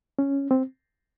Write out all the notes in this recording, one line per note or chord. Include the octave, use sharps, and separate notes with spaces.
C#4
C4